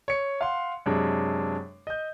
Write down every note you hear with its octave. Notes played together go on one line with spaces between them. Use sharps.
C#5 C#7
F5 F#5 C6
F#2 C3 G#3 D4
D#5 G6